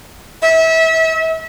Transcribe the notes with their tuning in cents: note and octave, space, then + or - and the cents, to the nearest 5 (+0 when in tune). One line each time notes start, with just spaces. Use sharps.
E5 -30